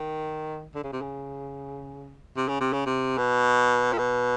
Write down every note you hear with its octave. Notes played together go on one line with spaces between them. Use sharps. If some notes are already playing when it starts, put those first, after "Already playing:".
Already playing: D#3
D3
C#3
C3
C#3
C3
C#3
C3
C#3
C3
B2
A#2
B2